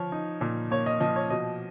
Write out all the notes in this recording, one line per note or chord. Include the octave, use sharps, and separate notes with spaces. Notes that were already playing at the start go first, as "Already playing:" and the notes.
Already playing: F3 C#5
D#4
A#2
A#3 C#5
D#5
F3 D#5
C#5
B2 D#5